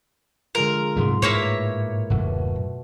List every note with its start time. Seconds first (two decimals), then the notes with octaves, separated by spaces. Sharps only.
0.55 D3 G#3 F4 A#4
0.96 G#2 C3 F#3 A3 C6
1.22 A2 A#3 E4 B4 C#5 A#6 C7
2.10 D1 F#2 B2 A3 F#4